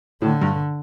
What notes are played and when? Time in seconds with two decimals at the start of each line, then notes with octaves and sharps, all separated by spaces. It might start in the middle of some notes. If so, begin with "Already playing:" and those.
0.22 A2 D3
0.42 G2